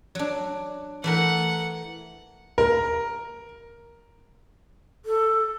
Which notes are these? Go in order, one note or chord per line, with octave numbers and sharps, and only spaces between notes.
F#3 D4
E3 A3 A#4 F#5
A#4
A4